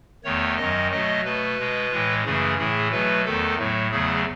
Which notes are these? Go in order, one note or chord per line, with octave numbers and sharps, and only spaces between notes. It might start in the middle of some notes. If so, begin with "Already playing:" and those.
E2 D#3 A3 C#5
F#2 D#3 F#3 D#5
B2 F#3 A3 D#5
B2 A3 B4
B2 G#3
A2 E3 G#3
F#2 C#3 E3 A3 G#4
A2 E3 A3 G#4
B2 F#3 A3 B4
E2 D#3 A3 A4
A2 F#3 A3
E2 C#3 F#3 A3 G#4